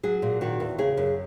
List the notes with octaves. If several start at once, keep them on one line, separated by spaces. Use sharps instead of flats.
F#3 G#4
A#2
D#3 F#4
E2
C#3 G#4
F#2